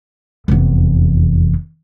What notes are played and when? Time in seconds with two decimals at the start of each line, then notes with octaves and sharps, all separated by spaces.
0.48 F1 E2